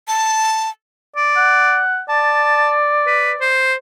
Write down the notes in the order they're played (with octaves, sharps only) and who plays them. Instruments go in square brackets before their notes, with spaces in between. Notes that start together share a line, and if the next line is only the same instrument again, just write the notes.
[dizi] A5
[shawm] D5
[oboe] F#5
[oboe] D5 [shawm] A5
[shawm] B4
C5